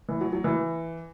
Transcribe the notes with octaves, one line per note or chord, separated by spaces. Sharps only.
E3
F#3
F#3
E3